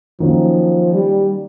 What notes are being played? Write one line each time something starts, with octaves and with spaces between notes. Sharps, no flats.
D#3 F3 F#3 A#3 C#4
G3